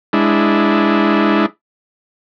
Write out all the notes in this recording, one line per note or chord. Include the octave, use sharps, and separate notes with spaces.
G#3 D4 E4